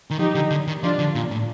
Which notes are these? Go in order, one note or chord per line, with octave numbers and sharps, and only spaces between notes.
D#3
F3 D#4 G4
D3
D3
D#3
F3 D4 F4
D3
A#2
A2